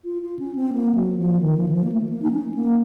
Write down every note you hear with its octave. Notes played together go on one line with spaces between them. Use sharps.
F4
F4
C#4
C4
A#3
F#3
F3
D#3
F3
D#3
F3
A#3
A3
A#3
D#4
C#4
A#3